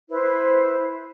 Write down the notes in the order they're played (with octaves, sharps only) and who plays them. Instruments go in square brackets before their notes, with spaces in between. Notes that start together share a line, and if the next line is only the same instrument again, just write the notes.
[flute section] E4 B4 C5